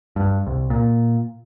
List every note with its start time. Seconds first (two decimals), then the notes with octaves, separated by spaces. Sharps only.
0.16 G2
0.47 C2
0.70 A#2